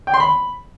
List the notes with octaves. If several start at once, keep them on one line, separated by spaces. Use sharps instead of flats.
G5
C6
B5